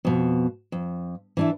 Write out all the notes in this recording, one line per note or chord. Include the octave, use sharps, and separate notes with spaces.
F2 B2
F2
E3 D4 E4